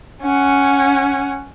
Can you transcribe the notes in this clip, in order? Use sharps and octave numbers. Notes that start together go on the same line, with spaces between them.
C#4 F#5